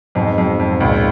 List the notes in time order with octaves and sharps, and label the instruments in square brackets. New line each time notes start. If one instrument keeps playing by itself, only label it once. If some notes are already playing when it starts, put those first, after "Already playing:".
[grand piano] F2 [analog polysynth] G#2 B2
[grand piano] F2
F2
[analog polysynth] G#2
[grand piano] C#2 [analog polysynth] A#2